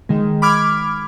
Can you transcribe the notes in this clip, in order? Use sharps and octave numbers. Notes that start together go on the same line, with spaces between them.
D#3 G#3
B5 D6 F6 G#6